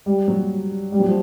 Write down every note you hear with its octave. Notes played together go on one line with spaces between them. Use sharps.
G3
F#3
G3
F#3
F3